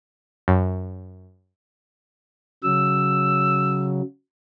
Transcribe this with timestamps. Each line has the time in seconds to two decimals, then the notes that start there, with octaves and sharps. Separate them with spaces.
0.48 F#2
2.64 C#3 F#3 E6